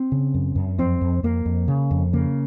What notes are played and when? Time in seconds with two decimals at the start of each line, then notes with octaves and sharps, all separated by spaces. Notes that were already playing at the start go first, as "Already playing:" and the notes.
Already playing: C4
0.12 C#3
0.34 F#2
0.56 F#2
0.78 F2 C4
1.01 F2
1.23 F2 A#3
1.45 F2
1.68 C#3
1.91 F2
2.13 C#3 A#3